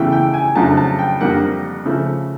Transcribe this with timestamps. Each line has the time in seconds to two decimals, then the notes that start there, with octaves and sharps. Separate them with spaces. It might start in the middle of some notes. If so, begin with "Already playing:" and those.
Already playing: E2 C#3 E3 A3 G5
0.12 G5
0.34 G#5
0.55 F2 C#3 F#3 A3 D4 A5
0.77 A5
0.99 G5
1.21 F2 D3 G3 A#3 F#5
1.85 C#3 F3 A3